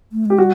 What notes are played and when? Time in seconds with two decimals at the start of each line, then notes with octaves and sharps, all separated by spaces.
0.12 A3
0.25 G#3 G4
0.38 G3 F#4